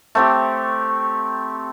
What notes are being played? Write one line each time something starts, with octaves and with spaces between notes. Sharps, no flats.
A3 C4 G4